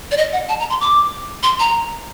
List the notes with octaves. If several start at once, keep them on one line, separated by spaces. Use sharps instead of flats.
D5
D#5
F#5
A5
A#5
C6
D6
C6
A#5